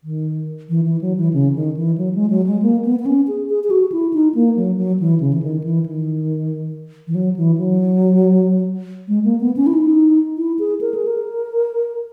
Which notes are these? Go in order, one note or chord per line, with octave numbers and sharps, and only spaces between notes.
D#3
E3
E3
F#3
E3
C#3
D#3
E3
F#3
G#3
F#3
G#3
A#3
B3
B3
C#4
G#4
G#4
G#4
F#4
E4
D#4
A#3
F#3
F#3
E3
C#3
E3
D#3
E3
D#3
E3
F#3
E3
F#3
G#3
A#3
B3
C#4
E4
D#4
E4
G#4
A#4
G#4
A#4